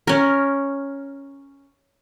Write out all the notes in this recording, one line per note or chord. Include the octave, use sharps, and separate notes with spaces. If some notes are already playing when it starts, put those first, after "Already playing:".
C#4 A#4